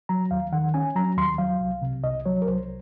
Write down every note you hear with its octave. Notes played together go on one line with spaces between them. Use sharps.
F#3 A#5
D#2 F5
D#3 F#5
C#4 G#5
F#3 A#5
D#2 C6
F#3 F5
C2
C3
C2 D#5
F#3 C#5
A#4
C2 C5